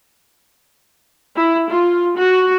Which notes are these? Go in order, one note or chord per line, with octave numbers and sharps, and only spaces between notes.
E4
F4
F#4